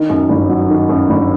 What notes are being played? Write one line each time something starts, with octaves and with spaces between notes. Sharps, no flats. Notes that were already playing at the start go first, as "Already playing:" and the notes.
Already playing: D#3
F#2
G1
F#3
D#3
F#2
G1